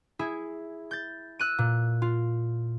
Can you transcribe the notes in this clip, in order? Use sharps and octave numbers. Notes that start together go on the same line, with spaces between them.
E4 G#4
G6 A6
E6 F#6 D#7
A#2
F4